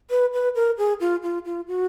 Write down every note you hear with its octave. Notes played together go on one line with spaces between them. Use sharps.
B4
B4
A#4
G#4
F4
F4
F4
F#4